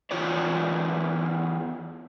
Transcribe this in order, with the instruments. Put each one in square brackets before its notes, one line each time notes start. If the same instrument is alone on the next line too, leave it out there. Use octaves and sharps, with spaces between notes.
[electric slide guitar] E2 F4 C#5 D5